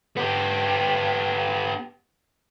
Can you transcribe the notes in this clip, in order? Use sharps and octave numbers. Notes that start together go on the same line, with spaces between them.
B3 G4